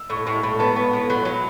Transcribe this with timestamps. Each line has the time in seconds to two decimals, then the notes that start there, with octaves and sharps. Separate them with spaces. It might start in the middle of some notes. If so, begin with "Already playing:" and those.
Already playing: E6
0.10 A2 C#6
0.26 A2 C#6
0.43 A2 B5
0.59 B3 A5
0.76 B3 C#6
0.93 A2 B5
1.10 F#3
1.18 B5
1.25 F#3